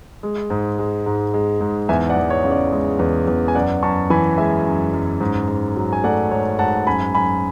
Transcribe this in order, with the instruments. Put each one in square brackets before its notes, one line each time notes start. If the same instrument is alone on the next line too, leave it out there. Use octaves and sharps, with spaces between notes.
[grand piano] G#3
G#2
G#3
G#2
G#3
G#2
E2 E5 G#5
D5 F#5
E2
C#5
C#3
D5
G#3
E2
E2
G#5
F#2 D5 F#5
F#2 A5 C#6
E3 G#5 B5
G#3 E5 G#5
F#2
F#2
G#2
G#2
F#3
G#5
A3 D5 F#5
G#2 C#5
G#2 F#5 A5
F#2 G#5 B5
F#2 G#5 B5